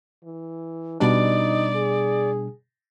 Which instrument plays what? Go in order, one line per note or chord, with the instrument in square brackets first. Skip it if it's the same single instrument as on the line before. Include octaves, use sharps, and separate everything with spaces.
[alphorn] E3
[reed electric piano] B2 G3 D4 [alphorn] D#4 [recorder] D5
[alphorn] G#4